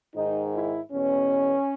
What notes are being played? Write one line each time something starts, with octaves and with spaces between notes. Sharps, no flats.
G#2 D#3 D#4
E4
E2 B2 C#4